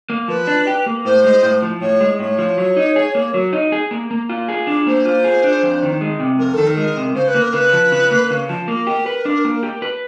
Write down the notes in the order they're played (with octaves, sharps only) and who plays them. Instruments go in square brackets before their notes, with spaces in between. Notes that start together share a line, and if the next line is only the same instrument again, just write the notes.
[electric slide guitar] A#3
[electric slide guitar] F3 [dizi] B4
[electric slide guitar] D4
G4
A#3
[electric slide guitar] A2 [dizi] C5
[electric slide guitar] G#3
A2
F3
[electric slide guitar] A2 [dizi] C#5
[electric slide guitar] G#3
[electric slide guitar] A2 [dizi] C#5
[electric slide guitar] F3
F#3
D#4
G#4
A#3
F#3
D#4
G#4
A#3
A#3
F4
G#4
D4
[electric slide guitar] A#3 [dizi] C5
[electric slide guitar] F4
G#4
D4
F2
D#3
G#3
C3
[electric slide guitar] F2 [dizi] A#4
[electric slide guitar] D#3 [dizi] A4
[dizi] A#4
[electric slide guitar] G#3
C3
[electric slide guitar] C#3 [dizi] C5
[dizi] B4
[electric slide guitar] A#3
[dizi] A#4
[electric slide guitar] C#3 [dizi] B4
[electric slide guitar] F3
C#3
A#3
C#3
F3
[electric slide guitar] A#3 [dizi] A#4
[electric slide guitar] G4
B4
D4
A#3
G4
B4